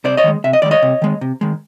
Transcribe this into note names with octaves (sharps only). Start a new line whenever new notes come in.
C3 C5 D5
C#5 D#5
D#3 G#3
C3 E5
D#5
D#3 G#3 D5
C#5 D#5
C3
D#3 G#3
C3
D#3 G#3